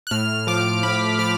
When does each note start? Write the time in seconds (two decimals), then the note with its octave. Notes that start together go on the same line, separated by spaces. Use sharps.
0.07 F#6
0.11 A2 F6
0.47 F3 D6
0.83 A2 B5
1.19 F3 F6